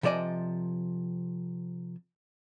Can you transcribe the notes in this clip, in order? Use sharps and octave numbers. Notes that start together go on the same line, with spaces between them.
C3 F3 A4 D5 D#5 G#5